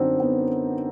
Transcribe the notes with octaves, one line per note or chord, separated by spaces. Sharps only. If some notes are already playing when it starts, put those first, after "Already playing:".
Already playing: F#2 D3 F#3 C4 D4 D#4
B3